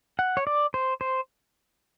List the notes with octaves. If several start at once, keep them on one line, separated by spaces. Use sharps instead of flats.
F#5
C#5
D5
C5
C5